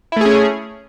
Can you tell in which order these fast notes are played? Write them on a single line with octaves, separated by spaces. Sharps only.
E4 A3 G#4 C#4